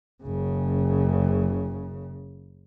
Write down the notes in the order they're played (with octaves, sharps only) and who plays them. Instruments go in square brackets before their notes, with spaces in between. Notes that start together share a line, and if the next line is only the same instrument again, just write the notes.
[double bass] F#1 C#3